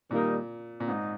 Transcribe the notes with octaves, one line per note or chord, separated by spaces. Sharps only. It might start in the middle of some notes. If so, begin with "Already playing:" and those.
A#2 D#3 G3 A#3 D#4
A#2
G#2 D#4